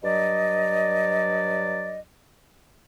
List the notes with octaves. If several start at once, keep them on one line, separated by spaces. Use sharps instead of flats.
G2 F#3 D5 D#5